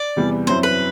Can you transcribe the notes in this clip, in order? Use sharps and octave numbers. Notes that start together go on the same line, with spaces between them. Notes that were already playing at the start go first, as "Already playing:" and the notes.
Already playing: D5
E2 C3 E3 G3 B3
F#2 F#3 C4 E4 C5
B4